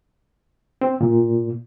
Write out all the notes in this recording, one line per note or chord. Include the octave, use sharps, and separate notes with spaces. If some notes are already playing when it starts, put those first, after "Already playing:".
C4
A#2